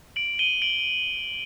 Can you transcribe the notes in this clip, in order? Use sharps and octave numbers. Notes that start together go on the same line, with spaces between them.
D7 F#7
D#7 G7
D7 F#7